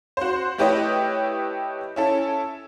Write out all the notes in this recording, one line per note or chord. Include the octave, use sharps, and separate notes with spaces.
F#4 C5
A3 E4 G4 B4 C#5 D#5
C#4 E4 A4